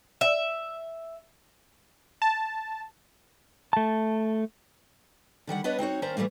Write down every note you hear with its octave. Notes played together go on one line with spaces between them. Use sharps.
E5
A5
A3 A5
D3 D#3 G3 F#5
B3 D4 B4 C#5 D#5
C4 D#4 F#4 C#5
D#2 C#4 A#4 C5 D5 A#5
E3 F3 G3 A3 A#3